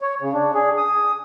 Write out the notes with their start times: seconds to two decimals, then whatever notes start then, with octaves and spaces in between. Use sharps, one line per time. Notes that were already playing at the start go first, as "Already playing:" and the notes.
0.01 C#5
0.21 C#3
0.33 D4
0.54 G#4
0.78 D#6